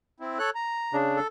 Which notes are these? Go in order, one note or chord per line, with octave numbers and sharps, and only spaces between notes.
C4 E4
A4 C#5 F#6
A#5
C#3 D4
A4